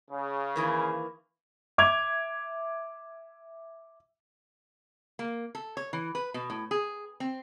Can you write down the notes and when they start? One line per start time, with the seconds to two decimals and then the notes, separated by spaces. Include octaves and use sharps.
0.11 C#3
0.56 D#3 E3 A#3
1.78 E5 D6 G#6 F7
5.19 A#3
5.55 A4
5.77 C#5
5.93 E3
6.15 B4
6.34 B2
6.50 A2
6.71 G#4
7.20 C4